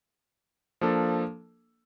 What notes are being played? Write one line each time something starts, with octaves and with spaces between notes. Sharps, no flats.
F3 A#3 D4 A4